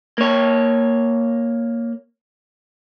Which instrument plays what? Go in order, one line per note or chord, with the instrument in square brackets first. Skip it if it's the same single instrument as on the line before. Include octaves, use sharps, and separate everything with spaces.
[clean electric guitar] A#3 C#5